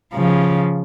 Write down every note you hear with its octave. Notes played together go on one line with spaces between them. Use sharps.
C#3 F3